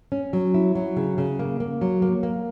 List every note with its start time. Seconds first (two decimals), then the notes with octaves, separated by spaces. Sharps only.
0.12 C#4
0.33 F#3
0.54 E4
0.75 F#3
0.96 C#3
1.18 C#3
1.39 A#3
1.60 A#3
1.81 F#3
2.02 A#3
2.23 A#3